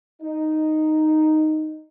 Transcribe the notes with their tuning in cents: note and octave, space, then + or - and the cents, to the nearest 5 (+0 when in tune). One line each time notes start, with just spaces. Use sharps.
D#4 -5